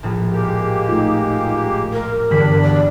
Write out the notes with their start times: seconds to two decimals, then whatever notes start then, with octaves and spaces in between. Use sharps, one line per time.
0.03 A#1 A2
0.32 G#3 A#3 G4
0.89 A3 D#4 F4
1.93 A#4
2.31 E2 G2 D3 E3 D4 B5 B6
2.63 D5